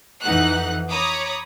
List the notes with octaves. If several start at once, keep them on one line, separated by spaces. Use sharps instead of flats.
F2 E3 D#4 F#5 F#6
C#5 A#5 B5 D6 D#6